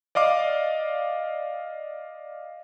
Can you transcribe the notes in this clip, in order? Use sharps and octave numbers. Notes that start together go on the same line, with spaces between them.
D5 D#5 F5 D6